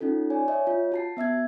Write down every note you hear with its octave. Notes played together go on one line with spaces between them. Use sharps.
C#4 D#4 F4 A4
C#5 D5 G#5
C#5 D#5 E5
F4
F#4 A5 C7
B3 E5 E6 G#6